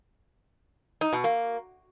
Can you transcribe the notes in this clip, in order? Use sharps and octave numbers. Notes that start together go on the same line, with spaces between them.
D#4
B2
A#3